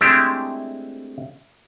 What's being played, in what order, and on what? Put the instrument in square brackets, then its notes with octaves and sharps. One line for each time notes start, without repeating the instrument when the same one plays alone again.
[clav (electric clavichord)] G#3 A3 C4 D4 E4 G4